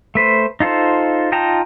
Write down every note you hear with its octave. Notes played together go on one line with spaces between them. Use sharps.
A3 B4 C5
D#4 F4 A4 C5
D#4 F4 G5 A5 A#5